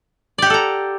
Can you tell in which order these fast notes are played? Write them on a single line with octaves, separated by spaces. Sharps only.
D5 G4 F#5 A4 A#5